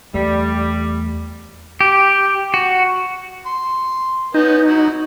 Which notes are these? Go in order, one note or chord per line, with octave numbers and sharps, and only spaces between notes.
E2 G3 A3
G4
F#4
C6
B3 C#4 D#4
F#3 E4